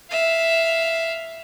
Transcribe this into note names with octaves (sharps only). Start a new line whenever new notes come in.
E5 F5